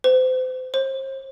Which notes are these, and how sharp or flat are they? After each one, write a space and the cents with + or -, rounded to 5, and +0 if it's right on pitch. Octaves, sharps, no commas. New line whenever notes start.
C5 -35
C5 +40